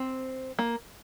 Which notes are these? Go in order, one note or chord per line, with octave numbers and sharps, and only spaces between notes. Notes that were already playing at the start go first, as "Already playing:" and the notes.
Already playing: C4
A#3